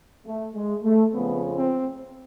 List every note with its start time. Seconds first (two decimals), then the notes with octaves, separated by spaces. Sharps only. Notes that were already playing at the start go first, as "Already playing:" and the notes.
0.27 A3
0.55 G#3
0.84 A3
1.13 F2 C#3 F3 B3
1.56 C4